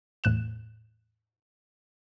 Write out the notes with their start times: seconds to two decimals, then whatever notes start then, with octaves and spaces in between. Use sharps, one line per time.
0.24 E2 A2 F#6 E7